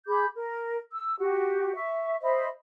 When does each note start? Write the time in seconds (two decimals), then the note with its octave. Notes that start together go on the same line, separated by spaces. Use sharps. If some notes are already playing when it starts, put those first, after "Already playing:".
0.07 G#4 B5 D6 G6
0.35 A#4
0.91 E6
1.19 F#4 G4
1.75 E5 C#6
2.22 C5 D#5 E5 B5